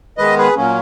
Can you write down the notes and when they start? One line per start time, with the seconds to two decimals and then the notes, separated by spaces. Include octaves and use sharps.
0.18 D#3 G#3 B3 B4 D#5
0.37 G#4 B4
0.56 A#2 F#3 A#3 C#4